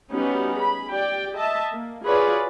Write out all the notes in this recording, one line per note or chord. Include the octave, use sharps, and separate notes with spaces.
G3 B3 C#4 D#4 F#4 G4
G#4 B5
G4 D5 G5
D#5 E5 A5
A#3
F4 F#4 G#4 B4 C#5 D5